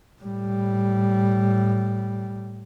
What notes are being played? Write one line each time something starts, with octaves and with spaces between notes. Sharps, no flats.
A2 G3